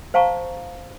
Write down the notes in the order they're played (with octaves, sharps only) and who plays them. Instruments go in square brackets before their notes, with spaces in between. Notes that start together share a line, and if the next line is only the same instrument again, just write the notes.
[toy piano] C5 F5 A5 A#5 C#6